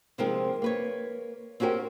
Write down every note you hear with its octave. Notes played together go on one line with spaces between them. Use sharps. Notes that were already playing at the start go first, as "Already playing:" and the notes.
C3 F3 G#3 C4 D#4 A#4
A#3 B4 C#5
C4 C#4 F#4 G4 A#4